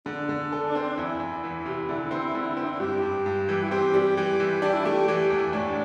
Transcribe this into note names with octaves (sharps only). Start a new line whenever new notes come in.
D3 D4
D3
A4
C4
E2 E4
E2
E3
C3
D3
C4
D3
C4
D4
E4
G2 G4
G2
G2
E3
E4
C4 G4
G3
E3 G4
E3
D4 G4
E4
A3 G4
E3 G4
E2
A2 D4